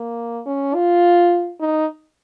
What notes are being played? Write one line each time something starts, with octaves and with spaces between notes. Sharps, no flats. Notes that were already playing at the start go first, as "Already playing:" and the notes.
Already playing: A#3
C#4
F4
D#4